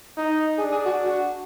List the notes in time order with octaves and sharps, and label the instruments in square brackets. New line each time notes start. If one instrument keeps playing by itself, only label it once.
[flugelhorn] D#4
[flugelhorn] D4 [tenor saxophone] G#4
[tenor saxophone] G#4
F#4
F#4